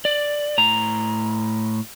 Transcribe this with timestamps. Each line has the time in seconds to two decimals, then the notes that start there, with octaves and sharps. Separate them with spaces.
0.05 D5
0.58 A2 A#5